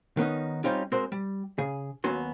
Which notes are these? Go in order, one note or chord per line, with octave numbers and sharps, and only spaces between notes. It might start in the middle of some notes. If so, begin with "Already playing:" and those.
D#3 B3 C#4 D#4
G3 C4 C#4 D#4 F4 G4
G#3 C4 F#4 A#4 C5
G3
C#3 G#4
D#2 F#3 B3 C#4 F#4 C6